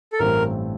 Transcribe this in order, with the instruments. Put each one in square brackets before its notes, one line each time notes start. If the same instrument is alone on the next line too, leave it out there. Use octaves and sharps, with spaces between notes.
[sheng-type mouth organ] A4
[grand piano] A1 G2 E3 A3 C4 [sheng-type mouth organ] A#4